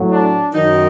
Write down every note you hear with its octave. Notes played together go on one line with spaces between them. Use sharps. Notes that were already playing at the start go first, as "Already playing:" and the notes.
Already playing: A2 F#3
D4
F#2 D#3 F#3 D#4